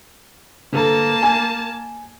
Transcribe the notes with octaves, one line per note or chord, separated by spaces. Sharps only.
G1 A#3 A4 A5 A#5
G#5